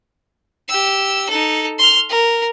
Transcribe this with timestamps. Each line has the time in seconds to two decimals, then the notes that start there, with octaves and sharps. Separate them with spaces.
0.68 G4 E6
1.29 D#4 A4
1.78 C6 F6
2.09 A#4